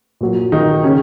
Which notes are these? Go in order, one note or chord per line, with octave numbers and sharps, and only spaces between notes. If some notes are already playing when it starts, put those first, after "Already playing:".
A#2 F#3
D#3 D#4
C#3 C#4